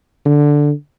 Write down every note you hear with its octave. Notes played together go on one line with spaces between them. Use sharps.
D3